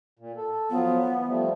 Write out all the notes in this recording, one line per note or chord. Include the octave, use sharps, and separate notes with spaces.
A#2
A4
F3 F#3 B3 F4
E3
F3 G3 A3